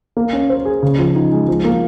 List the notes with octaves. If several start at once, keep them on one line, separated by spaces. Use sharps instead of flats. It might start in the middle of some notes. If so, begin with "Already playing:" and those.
A#3
C#4
C5
G#4
C#3
F3
D#4
G#3
F3
A#3